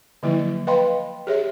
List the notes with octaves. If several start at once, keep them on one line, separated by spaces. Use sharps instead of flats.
D3 F3 F#3 A#3 E4
B4 D#5 F5 G5 B5 C6
G4 G#4 C#5 E5